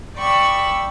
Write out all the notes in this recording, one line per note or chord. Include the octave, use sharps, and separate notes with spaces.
D5 G5 B5 C#6 E6